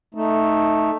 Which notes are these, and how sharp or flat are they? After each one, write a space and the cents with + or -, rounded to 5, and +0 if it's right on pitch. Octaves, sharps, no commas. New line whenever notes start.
A3 +0 D#4 +0